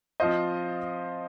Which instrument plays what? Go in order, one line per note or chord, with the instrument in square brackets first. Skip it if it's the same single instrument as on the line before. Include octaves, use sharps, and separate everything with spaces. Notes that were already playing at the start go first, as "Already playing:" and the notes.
[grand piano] F3 C4 F4 C5 D#5